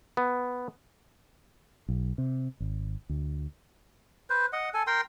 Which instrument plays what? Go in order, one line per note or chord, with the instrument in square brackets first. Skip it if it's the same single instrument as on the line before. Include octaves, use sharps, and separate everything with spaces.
[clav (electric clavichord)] B3
[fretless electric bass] B1
C3
G#1
D2
[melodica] B4 C5
D#5 F#5
A4 G#5
A#4 G5 C6